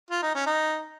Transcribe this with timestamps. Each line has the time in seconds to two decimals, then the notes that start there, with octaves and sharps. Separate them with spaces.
0.10 F4
0.22 D#4
0.35 C#4
0.47 D#4